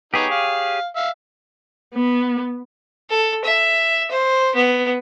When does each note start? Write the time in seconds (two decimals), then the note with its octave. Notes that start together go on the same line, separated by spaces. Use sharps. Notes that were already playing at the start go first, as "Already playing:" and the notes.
0.14 B3 D#4 G4 G#4 C#5
0.31 F5
0.96 E5 F5
1.94 B3
3.10 A4
3.44 E5
4.11 C5
4.55 B3